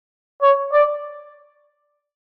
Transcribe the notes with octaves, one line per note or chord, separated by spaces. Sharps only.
C#5
D5